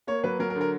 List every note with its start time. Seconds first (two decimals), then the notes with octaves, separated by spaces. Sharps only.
0.07 A#3 C#5
0.24 F#3 B4
0.39 F#3 A#4
0.50 A#4
0.55 D3
0.61 A#4